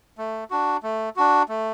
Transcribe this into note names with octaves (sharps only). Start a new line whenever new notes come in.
A3
D4 F#4
A3
D4 F#4
A3